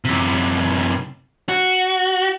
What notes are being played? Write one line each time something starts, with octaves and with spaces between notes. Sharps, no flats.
F#2 C3
F#4